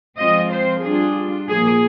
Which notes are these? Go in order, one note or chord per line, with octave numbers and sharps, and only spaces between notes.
F3 G#3 C4 F4 D#5
C5
G3 D4 F4 G#4
A#2 F3 A#3 G#4